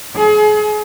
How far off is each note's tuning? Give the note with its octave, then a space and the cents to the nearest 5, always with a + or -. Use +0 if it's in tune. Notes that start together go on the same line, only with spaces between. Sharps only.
G#4 +35